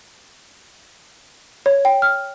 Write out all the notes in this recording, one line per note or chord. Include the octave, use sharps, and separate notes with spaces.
C#5
G5
F6